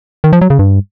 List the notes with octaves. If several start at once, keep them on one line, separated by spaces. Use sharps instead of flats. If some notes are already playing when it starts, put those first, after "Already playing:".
D#3
F3
F#3
C#3
G2